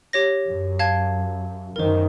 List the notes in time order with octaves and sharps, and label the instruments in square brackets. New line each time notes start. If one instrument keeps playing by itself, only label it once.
[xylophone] G4 C#5 A#6
[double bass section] F#2
[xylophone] F5 A5 G#6
[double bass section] F#2 D#3 [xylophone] A#4 C5